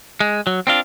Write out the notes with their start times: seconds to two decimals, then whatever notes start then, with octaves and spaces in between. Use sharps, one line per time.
0.20 G#3
0.47 F#3
0.67 C4 D4 F4